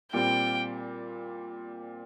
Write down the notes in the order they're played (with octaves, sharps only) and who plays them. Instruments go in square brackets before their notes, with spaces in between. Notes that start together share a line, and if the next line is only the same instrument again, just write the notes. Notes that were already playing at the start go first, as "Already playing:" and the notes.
[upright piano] A#2 G3 C4 [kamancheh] G5